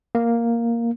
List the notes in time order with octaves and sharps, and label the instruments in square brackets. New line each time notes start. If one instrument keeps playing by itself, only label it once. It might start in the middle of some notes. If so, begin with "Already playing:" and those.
[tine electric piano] A#3